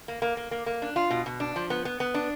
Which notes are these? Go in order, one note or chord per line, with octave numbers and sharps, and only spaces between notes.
A#3
A#3
A#3
A#3
A#3
D4
F4
B2
B2
D4
F3
B3
B3
B3
D4